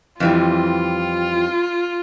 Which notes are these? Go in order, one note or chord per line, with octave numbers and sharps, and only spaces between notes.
F2 E3 G3 F4